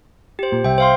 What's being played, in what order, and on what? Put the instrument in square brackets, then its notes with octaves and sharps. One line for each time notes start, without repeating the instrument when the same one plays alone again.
[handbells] G4 C5
[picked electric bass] A#2
[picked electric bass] C2 [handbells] E5 G5
[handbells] C5 F5 C6